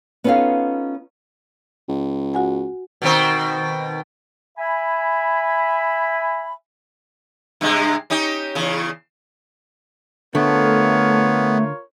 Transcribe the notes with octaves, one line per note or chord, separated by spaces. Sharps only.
B3 C#4 D#4 F4 A4 F5
C#2
F#4 F#5 G#5
B2 D#3 C4
E5 G#5 B5
G2 C3 G#3
C#4 D#4 G4
E2 C#3
D3 A3 B3 F4 A#4 C#5